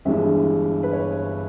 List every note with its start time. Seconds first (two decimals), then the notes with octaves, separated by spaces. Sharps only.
0.05 G1 G2 E3 G#3 E5
0.83 B4
0.93 C#5